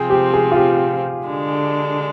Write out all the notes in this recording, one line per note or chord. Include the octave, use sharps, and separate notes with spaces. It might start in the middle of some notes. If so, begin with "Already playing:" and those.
Already playing: C3 F3 C4 G#4
G4
G#4
F4
G4
D3 G#3 D4